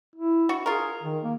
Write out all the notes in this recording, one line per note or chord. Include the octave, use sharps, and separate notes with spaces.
E4
F#4
F4 G#4 A#4
D#3
A#3